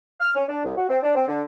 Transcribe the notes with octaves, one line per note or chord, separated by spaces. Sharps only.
F6
C#4
D4
C2
F#4
C4
D4
C4
D3